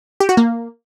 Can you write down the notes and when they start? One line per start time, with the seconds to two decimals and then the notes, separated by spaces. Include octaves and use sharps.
0.20 G4
0.29 F#4
0.37 A#3